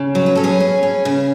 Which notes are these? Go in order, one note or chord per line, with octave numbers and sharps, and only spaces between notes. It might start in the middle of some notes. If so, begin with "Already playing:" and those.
Already playing: C#3
F#3
B4
C#4 A4
G#4 B4
C#4
C#4
C#3